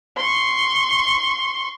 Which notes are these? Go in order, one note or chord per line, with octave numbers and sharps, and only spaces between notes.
C6 C#6